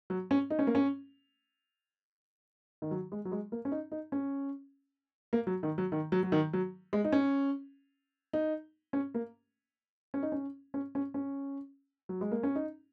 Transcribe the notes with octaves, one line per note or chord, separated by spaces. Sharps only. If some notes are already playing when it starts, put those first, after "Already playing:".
F#3
C#4
D#4
C#4
A#3
C#4
D#3
F#3
G#3
F#3
G#3
A#3
C#4
D#4
D#4
C#4
A#3
F#3
D#3
F#3
D#3
F#3
F#3
D#3
F#3
G#3
D#4
C#4
D#4
C#4
A#3
C#4
D#4
C#4
C#4
C#4
C#4
F#3
G#3
A#3
C#4
D#4